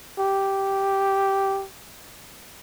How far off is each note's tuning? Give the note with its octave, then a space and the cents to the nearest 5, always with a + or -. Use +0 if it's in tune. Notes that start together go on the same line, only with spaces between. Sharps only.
G4 -5